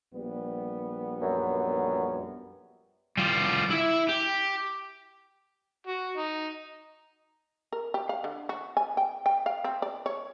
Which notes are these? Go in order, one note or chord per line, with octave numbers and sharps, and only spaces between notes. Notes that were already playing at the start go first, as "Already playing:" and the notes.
A#1 G3 B3
F#2
G3 F4
E4 E5
G4
F#4
D#4
A#4
G4
F5
D3
F#4
G#5
G5
G5
F5
C4
D5
C#5